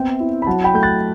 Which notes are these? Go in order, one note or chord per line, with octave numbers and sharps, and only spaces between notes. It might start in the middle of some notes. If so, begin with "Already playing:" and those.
Already playing: B3 C4 E5 G5
E4
B5
F#3 F#5 A5
G5 B5
A3 G6
F#6 A6